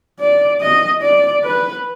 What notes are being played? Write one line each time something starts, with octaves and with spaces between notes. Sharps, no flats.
D5
D#5
D5
B4